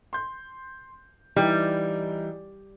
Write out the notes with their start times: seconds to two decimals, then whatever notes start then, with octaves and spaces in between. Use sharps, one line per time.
0.13 C6 G6
1.36 E3 G3 D#4 E4